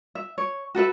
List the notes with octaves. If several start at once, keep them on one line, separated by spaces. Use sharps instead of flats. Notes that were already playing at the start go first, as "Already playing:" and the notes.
E5
C#5
F#4 A4 B4 E5